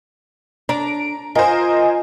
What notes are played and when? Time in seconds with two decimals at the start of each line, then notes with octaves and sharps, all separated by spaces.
0.69 D4 A#5 D7
1.35 F4 A#4 C5 D#5 G#5